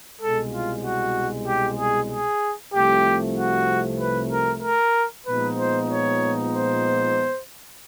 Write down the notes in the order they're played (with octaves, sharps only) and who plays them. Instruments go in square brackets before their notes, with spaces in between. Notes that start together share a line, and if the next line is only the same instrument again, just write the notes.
[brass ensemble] C2 B2 G#3 A4
F4
F#4
G4
G#4
G#4
C2 C3 F3 A3 G4
F#4
B4
A#4
A#4
A#2 F3 G#3 B3 D#4 B4
C5
C#5
C5